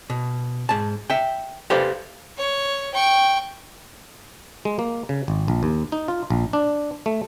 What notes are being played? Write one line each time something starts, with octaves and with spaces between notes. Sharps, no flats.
B2
G#2 A5
E5 G5
G4 A4 B4 C5 D5 F5
C#5
G5 C#6
G#3
A#3
C#3
G#1
A#1
D#2
D#4
F4
A#1
D4
A3